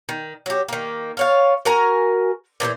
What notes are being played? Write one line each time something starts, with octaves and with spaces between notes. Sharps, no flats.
D#3
F#3 G4
D#3 A#3
F4 C#5 F5
F#4 A#4 G#5 A#5
A#2 E3 E4 C5